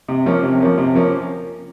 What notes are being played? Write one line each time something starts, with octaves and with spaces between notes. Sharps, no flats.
C3
F3 A#3 C#4
C3
F3 A#3 C#4
C3
F3 A#3 C#4